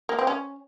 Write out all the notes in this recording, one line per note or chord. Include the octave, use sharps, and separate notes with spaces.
A#3
C4
C#4